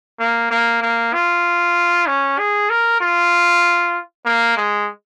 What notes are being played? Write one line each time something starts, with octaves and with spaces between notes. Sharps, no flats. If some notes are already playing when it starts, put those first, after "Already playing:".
A#3
A#3
A#3
F4
C#4
G#4
A#4
F4
A#3
G#3